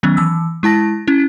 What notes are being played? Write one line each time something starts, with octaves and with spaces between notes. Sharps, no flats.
D#3 F#3 B3 C#4
E3 E6
G#3 E4 A5 A#6
C#4 E4